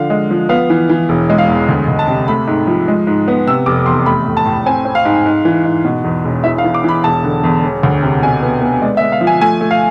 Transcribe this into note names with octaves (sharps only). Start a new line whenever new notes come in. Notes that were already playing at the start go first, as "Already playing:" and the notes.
Already playing: D3 F3 F5
G#3
F3
B3 F5
E3
E3
E1
G#3
F5
E2
D2
D2
A5
C3
A3 B5
G#2
F3
G#3
G#2
B3
C3 E6
F1 D6
E2 C6
A3 B5
A2
A5
A2
C4 G#5
C4
F5
G#2
G#2
E3
G#2
B2
E2
E1
E3 E5
F5
E3
D6
E3 B5
E1 A5
D3
E2
E1
D2
C3
B2 G#5
B3
B3
G#3 D5
E5
G#3
F5
F3
G#5
A3 G#5
A3
F5